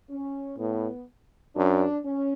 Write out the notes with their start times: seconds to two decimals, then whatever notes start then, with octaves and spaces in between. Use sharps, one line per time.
0.10 C#4
0.58 A2 B3
1.55 F#2 D4
2.04 C#4